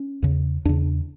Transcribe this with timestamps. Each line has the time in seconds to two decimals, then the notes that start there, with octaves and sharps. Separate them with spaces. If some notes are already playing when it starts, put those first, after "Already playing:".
Already playing: C#4
0.22 E2 C#3
0.65 E2 C#3 D4